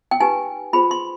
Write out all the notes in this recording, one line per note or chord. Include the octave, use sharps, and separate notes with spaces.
G5
D#4 G4 B4 G#5
F4 G#4 C5 B5
C6